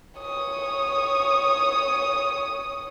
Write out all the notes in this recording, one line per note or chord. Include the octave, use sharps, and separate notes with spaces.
C#5 D#6